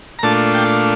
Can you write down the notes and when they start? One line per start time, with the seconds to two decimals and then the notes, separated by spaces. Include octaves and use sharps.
0.19 A#5
0.23 A#2 A3 D4 F4 A5
0.54 G5